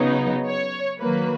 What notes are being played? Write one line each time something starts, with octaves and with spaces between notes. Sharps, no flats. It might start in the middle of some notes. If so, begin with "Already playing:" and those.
Already playing: C#3 F#3 B3 D#4
C#5
D#3 F#3 A#3 B4